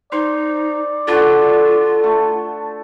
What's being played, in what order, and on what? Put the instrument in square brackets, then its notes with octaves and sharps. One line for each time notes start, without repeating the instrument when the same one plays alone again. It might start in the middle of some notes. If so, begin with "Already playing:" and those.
[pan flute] D#4 [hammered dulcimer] C5 [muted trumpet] D5
[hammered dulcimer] D3 F#4 [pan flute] F4 [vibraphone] A4
[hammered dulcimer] A3